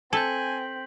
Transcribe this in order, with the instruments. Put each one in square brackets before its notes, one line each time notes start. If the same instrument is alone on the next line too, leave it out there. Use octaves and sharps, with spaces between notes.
[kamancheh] C4 [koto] A4 [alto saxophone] G#5 [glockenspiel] G6 B6 F#7